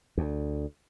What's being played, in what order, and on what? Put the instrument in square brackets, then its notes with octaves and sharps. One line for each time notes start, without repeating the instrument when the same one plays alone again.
[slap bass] D2